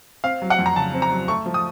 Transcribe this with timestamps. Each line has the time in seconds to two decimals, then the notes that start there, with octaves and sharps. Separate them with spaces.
0.24 C4 F5
0.42 F#3
0.50 F#5
0.59 F2
0.66 A#5
0.76 C#3 A5
0.94 C4
1.02 A#5
1.11 F#3
1.28 A3 C#6
1.46 F3
1.54 D#6